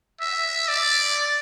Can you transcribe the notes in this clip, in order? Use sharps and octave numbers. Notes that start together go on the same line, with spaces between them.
E5
D5